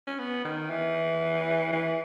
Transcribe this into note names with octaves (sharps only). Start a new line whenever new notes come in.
C#4
B3
D#3
E3
E3